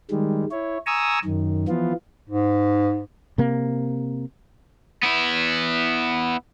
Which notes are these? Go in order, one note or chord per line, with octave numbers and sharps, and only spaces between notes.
D#3 G3 G#3
E4 C#5
G#5 A#5 C#6 D#6 E6
F#2 D#3
E3 F3 B3 F4
G#2
C3 A#3
B3 E4